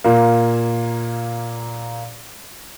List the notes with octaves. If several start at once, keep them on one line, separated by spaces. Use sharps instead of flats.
A#2 A#3